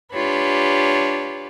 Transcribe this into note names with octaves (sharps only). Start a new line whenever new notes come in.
D4 F4 G4 B4 C#5